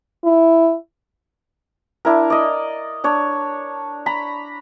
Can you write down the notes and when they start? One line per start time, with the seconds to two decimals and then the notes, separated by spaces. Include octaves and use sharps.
0.24 E4
2.05 D4 E4 A#4
2.30 D5 D#5
3.04 D4 C#5
4.06 A#5 B5